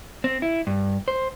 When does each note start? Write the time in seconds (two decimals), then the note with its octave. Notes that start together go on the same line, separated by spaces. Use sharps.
0.24 C4
0.42 E4
0.67 G2
1.08 C5